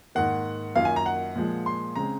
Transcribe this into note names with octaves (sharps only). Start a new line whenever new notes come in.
G#2 D#3 A#3 F#5
F#2 D#3 A#3 F4 F5
G#5
A#5
F#5
A#2 F3 G#3
C6
C#3 G#3 C4 A#5